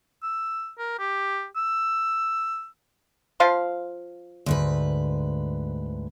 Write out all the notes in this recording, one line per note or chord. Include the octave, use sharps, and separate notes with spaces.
E6
A#4
G4
E6
F3 F5 C6
D2 G#2 B4